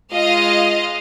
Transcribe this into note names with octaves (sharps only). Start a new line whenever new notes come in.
G#3 F4 D#5 F5